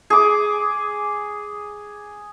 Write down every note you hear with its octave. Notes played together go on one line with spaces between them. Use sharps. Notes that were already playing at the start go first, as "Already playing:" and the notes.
G#4 D6